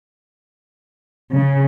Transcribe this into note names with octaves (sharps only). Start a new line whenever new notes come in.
C#3